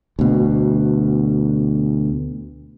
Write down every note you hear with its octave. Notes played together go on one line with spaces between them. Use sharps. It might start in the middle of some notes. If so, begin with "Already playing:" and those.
D2 B2